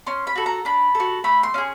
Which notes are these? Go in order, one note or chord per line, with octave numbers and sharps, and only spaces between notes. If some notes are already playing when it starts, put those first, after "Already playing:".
C#4 C6
B5
F#4 A4
A#5
D4 B5
A4
F#4
A3 B5
C6
C#4 F4 G#4